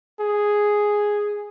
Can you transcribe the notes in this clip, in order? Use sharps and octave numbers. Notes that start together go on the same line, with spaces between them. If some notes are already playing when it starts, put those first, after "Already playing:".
G#4